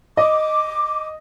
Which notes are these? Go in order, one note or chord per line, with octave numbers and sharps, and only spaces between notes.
D#5 D6